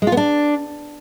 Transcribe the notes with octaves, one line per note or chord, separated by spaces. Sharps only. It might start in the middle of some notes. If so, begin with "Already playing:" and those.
G#3
F4
B3
D4